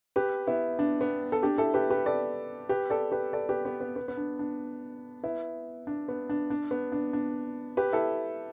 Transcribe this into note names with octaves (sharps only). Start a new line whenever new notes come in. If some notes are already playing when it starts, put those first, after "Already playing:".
G4 B4
B3 E4
D4
B3
A4
D4 G4
E4 A4
G4 B4
G4 B4
A4 D5
G4 B4
A4 D5
G4 B4
A4 D5
G4 B4
B3
B3
B3
B3
D4
D4
B3 E4
D4
B3
D4
D4
B3
D4
D4
G4 B4
E4 A4